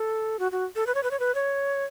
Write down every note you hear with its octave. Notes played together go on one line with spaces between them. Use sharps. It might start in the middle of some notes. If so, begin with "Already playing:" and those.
Already playing: A4
F#4
F#4
A4
B4
C#5
B4
C#5
B4
C#5